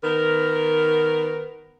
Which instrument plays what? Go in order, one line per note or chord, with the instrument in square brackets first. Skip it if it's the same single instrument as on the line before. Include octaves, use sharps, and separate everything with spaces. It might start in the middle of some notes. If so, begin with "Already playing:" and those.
[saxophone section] D#3 B3 A#4